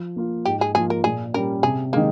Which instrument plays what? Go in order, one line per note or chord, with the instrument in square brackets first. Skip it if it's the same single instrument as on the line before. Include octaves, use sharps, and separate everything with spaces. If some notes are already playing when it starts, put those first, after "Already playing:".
Already playing: [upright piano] F3
A#3 F4
[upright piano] G#2 [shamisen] G4
[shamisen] G#4
[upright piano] F3 A#3 F4 [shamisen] G#4
[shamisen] A#4
[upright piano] A#2 [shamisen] G#4
[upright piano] G3 C#4 [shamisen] A#4
[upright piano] C3 [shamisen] G#4
[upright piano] D#3 G#3 [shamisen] A#3